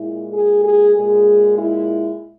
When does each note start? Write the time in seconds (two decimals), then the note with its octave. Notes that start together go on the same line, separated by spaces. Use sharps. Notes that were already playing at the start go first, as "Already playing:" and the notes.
Already playing: A#2 G#3 E4
0.33 G#4
0.65 G#4
0.96 A#2 G#3 G#4
1.59 E4